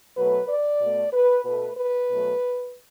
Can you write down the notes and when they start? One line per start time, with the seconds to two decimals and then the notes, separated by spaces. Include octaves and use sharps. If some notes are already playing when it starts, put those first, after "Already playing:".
0.17 B2 F#3 A3 B4
0.49 D5
0.81 B2 A3
1.13 B4
1.45 B2 A3 B4
1.77 B4
2.10 B2 F#3 A3